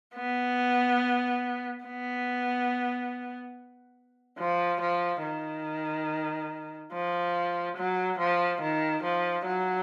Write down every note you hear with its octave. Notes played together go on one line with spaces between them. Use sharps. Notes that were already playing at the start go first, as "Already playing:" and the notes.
B3
B3
F3
F3
D#3
F3
F#3
F3
D#3
F3
F#3